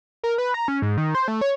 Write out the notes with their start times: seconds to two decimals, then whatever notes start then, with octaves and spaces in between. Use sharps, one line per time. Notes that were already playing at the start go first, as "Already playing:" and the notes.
0.24 A#4
0.38 B4
0.54 A#5
0.68 C#4
0.82 G#2
0.97 D#3
1.15 C5
1.28 A3
1.41 C#5